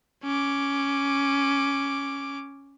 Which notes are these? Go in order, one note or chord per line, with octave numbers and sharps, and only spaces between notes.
C#4 D6